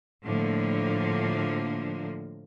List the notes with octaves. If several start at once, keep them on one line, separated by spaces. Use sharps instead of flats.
A2 D3 F3 A#3